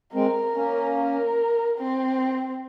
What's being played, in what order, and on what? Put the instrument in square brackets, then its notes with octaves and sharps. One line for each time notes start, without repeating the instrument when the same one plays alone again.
[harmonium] G#3 C4 [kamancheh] A#4
[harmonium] A#3 C#4
[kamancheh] A#4
C4